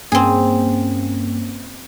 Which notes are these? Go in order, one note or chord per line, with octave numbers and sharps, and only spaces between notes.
G2 A#3 C4 C#4 G#4